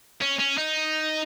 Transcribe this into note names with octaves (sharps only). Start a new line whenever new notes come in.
C#4
C#4
D#4